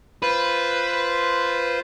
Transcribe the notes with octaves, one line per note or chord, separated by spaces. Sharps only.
F4 B4 C5